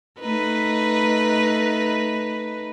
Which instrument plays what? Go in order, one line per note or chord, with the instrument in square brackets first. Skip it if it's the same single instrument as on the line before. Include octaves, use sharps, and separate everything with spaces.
[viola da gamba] A3 D#4 B4